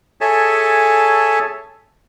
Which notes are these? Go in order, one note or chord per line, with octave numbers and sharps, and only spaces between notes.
G#4 A4 C#5 E5 G#5 A5